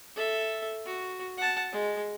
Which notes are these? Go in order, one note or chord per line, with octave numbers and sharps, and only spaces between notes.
A4 E5
F#4
F#5 A5
G#3